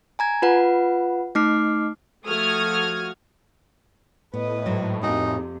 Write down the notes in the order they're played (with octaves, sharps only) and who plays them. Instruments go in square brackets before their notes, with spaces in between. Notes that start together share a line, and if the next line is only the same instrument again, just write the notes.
[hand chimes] G#5 A#5 G#6
F4 B4 F#5
A3 D#4 D6 F6 C7
[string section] F3 A3 F#4 D#6 F6 G#6
[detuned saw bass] A2 [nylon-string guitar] B3 [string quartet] B4 D#5
[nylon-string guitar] G#2 F#3
[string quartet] F2 C3 [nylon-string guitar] A#3 F#4 G#4 [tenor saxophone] D#4